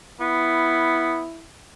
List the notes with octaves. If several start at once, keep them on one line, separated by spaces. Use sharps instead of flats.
B3 E4